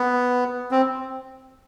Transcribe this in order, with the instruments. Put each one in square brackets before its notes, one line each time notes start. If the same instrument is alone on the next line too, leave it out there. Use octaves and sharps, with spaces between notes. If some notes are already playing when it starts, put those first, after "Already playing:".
Already playing: [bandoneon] B3
C4